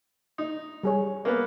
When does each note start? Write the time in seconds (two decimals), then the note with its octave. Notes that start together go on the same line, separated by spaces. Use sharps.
0.38 D#4
0.83 G3 G#4 C#5
1.25 A#3 B3 B4